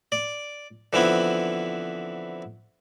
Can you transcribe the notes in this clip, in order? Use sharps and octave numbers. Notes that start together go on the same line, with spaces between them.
D5
D3 E3 F3 B3 C4 E4